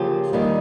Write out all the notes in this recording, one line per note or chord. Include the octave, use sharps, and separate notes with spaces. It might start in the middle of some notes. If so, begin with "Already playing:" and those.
Already playing: C#3 F3 A#3 G4
D#3 G3 A#3